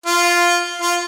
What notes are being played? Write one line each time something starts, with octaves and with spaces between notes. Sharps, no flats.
F4
F4